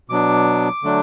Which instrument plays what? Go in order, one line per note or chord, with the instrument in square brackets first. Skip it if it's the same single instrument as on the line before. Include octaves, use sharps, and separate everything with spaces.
[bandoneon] B2 F#3 B3 D4 D6
D3 F#3 A3 D4